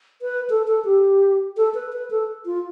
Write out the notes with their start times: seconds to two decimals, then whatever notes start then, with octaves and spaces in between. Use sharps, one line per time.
0.22 B4
0.50 A4
0.68 A4
0.85 G4
1.57 A4
1.74 B4
1.93 B4
2.11 A4
2.46 F4